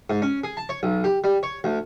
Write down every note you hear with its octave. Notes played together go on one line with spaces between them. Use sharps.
G#2
C#4
G#4
A5
C#5
B1
G4
G3
C#5
D2